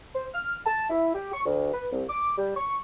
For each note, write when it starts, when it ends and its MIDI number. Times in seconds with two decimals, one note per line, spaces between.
0.15 0.26 72
0.34 0.56 89
0.66 0.84 81
0.90 1.14 64
1.15 1.29 67
1.33 1.42 85
1.45 1.70 38
1.73 1.86 71
1.92 2.04 36
2.08 2.32 86
2.37 2.51 55
2.56 2.77 85